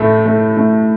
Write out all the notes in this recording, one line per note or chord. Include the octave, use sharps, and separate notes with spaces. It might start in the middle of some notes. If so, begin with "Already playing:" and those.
Already playing: A2 A3
A3
A3